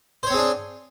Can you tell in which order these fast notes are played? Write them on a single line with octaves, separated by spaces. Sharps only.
C5 C#5 C4 G#4 D4